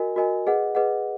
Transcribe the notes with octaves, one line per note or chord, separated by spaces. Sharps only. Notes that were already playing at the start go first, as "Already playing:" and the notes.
Already playing: F#4 A#4 D#5 G#5
F#4 A#4 D#5 G#5
G#4 B4 D#5 F#5
G#4 B4 D#5 F#5